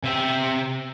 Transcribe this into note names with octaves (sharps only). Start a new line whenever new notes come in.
C3 E5 G5